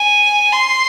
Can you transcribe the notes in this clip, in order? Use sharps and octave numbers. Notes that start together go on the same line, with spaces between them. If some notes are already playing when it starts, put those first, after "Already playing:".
Already playing: G#5
C6